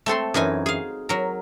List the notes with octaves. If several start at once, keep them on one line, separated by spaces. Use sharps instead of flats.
A3 C4 A4 C6
F#2 E3 D#4 G#5
G#4 F5
F#3 A#4